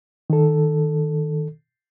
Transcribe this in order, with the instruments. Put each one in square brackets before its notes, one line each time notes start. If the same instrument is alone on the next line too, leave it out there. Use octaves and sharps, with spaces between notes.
[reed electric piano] D#3 A4